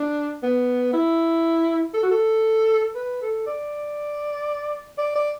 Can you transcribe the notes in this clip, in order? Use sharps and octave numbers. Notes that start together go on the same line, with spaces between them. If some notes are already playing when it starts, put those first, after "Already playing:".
Already playing: D4
B3
E4
A4
F#4
A4
B4
A4
D5
D5
D5